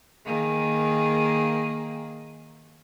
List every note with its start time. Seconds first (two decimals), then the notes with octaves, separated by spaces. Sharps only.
0.25 D#3 A#3 G#4